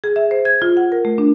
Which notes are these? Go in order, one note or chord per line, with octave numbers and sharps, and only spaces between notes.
G#4
E5
C5
G#6
F4
F#5
A#4
A3
D4